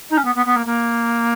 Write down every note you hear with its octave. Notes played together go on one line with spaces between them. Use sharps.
D#4
C#4
B3
B3
B3
A#3
A#3